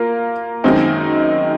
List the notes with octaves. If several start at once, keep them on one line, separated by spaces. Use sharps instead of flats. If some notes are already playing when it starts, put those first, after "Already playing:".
Already playing: A#3 F4 A#4
F#2 D#3 G#3 C4 D#4